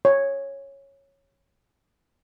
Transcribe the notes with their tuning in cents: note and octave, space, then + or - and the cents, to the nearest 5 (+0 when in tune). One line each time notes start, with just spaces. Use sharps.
C#5 -10